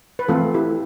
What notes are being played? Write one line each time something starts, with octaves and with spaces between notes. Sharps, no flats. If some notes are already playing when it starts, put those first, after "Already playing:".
B4
E3 A3 C4 F4 A4
E4 G4